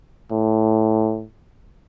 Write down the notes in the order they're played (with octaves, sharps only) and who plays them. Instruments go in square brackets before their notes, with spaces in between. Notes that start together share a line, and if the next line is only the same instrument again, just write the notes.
[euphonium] A2